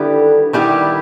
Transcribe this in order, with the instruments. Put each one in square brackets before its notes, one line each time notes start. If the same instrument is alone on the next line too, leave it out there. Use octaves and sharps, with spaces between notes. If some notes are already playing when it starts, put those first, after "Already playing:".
Already playing: [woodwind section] D3 [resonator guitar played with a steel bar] D#3 G3 B3 E4 G4
[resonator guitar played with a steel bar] D#3 G3 B3 E4 G4